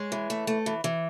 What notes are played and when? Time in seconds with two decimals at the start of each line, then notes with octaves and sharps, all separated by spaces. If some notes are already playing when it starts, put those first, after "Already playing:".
Already playing: G#3 C#5
0.12 E3
0.30 A3
0.47 A3
0.66 E3
0.84 E3